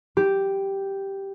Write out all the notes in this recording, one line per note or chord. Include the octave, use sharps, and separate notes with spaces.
G4